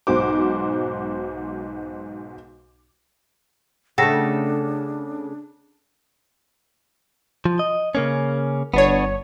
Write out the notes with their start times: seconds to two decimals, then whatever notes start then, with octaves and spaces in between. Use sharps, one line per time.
0.07 B1 G#2 F#4 C5 D6
3.98 C#3 A3 D4 A4 F#5 G5 A#6
7.45 F3
7.59 D#5
7.95 C#3 A#3 C#4
8.74 G1 B3 D4 C#5